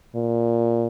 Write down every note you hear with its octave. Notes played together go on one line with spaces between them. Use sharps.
A#2